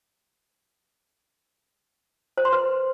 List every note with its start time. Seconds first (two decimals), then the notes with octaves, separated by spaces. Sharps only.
2.38 C5
2.45 C6
2.53 B4